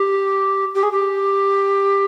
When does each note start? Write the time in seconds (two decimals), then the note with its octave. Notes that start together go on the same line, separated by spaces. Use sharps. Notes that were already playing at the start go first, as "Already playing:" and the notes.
Already playing: G4
0.75 G4
0.83 G#4
0.92 G4